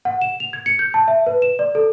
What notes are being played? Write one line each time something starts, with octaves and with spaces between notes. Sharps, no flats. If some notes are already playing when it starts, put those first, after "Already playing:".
F#5
E7
F7
G#6
C#7
G6
A5
E5
B4
E7
D5
A4